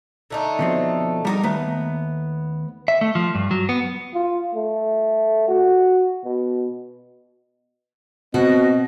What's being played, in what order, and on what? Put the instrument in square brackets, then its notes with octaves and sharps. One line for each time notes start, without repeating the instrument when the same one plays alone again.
[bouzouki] D3 A3 D#4
[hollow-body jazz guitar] B2 F3 C4
[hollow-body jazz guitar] G3 [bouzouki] D#4 F#4 A#4
[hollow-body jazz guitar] D#2 A3 A#5 [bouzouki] B3
[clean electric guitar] E5
A3
F3
G2
F#3
B3
[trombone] F4
A3
F#4
B2
[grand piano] B2 [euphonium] C4 [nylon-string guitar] F#4 [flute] D#5